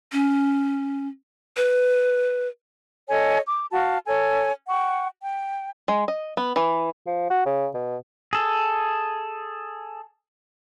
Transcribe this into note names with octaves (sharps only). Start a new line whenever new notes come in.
C#4
B4
A4 C#5 D#5 G#5
D6
F#4 F5 A5
A4 C#5 G#5
F#5 G5 C#6
G5
G#3
D#5
B3
E3
F3
F#4
C#3
B2
G#4 A4